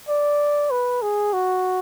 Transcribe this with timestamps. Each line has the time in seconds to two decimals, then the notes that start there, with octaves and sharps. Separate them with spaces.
0.09 D5
0.71 B4
1.02 G#4
1.33 F#4